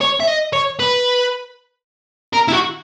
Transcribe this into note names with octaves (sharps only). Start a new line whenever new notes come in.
C#5
E5
D#5
C#5
B4
A#4
E4
F#4